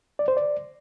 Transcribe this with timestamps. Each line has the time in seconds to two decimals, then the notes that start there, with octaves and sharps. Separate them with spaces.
0.19 D5
0.28 C5
0.37 D5